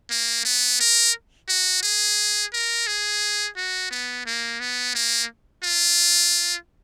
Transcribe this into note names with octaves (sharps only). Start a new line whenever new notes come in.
A#3
B3
A#4
F#4
G#4
A#4
G#4
F#4
B3
A#3
B3
A#3
F4